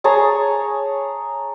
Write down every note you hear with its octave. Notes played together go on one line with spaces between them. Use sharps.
G#4 C#5 A5 A#5